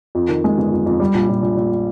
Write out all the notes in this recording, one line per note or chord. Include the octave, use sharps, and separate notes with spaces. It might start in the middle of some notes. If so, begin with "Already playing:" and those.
F2
D#3
G#3
G1
F2
F2
G3
A#1
A#1
A#1
A#1